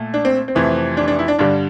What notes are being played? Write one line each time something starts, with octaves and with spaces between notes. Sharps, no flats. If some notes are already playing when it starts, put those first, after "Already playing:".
Already playing: A#2 A3
D4
C4
C4
F2 C3 E3 A3
D4
D4
E4
D4
G2 D3 G3 D4